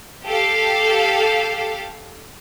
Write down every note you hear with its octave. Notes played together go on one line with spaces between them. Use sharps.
G4 A4 F5